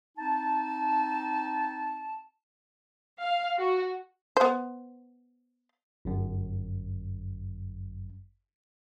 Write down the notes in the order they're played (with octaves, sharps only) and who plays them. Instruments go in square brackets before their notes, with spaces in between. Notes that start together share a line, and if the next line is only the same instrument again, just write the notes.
[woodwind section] C4 D#4 A5
[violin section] F5
F#4
[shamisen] B3 C5
[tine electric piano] G1 F#2